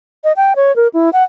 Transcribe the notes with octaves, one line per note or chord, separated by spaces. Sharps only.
D#5
G5
C#5
A#4
E4
F#5